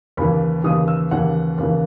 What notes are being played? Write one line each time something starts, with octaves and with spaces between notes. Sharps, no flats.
D#2 C#3 E3 B5
D#2 C#3 E3 D#6
E6
D#2 C#3 E3 F#5
D#2 C#3 E3